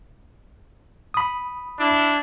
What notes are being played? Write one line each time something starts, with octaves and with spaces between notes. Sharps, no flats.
B5 D#6
D4 E4